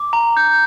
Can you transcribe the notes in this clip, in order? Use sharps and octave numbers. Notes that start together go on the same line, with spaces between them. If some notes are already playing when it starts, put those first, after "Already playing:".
Already playing: D6
A#5
G6